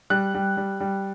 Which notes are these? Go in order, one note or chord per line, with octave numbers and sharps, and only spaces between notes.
G3 F#6
G3
G3
G3